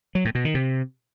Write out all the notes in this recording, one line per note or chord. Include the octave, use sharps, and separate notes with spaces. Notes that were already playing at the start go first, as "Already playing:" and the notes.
F#3
A2
B2
D#3
C3